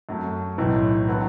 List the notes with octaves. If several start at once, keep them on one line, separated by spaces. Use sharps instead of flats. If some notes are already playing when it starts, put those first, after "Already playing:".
F#2 F#3 A3
B1 A2 E3
D3 F#3 B3 E4